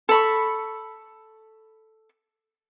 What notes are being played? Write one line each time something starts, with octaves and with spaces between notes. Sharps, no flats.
A4 B5 C#6